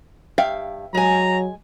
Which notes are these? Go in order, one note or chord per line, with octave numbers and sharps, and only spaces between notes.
G2 E5 F5 G5
F#3 G#3 G#5 A#5